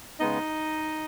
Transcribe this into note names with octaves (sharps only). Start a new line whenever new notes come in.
C#3 G#3 B3 D#4 D#5